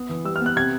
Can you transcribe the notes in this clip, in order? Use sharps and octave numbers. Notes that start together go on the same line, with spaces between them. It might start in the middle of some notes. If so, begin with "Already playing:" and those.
Already playing: B3 D#6
E3
G3 E6
F6
B3
F#6
C3 G#6